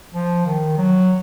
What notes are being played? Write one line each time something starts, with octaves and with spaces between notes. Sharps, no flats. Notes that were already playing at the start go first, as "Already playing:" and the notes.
F3
D#3
F#3